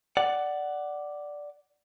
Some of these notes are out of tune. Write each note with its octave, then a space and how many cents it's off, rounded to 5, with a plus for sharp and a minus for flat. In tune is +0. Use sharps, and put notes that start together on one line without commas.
D5 +0 F#5 +15